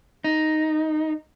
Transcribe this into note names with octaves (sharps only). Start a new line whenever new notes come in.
D#4